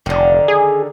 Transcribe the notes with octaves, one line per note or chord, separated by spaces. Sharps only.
F1 D3 D#3
G#4